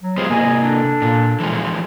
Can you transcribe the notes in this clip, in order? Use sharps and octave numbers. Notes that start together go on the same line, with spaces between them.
F#3
C3 G#3 B3 F4 G#4 C5
C3 A#3 D#5 G#5
D4 A4
A#2
E3 F3 G#3